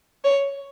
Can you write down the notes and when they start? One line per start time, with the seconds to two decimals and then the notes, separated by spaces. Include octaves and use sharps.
0.24 C#5